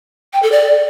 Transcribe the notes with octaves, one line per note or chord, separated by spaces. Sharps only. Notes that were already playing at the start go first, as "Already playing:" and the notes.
G5
A4
D5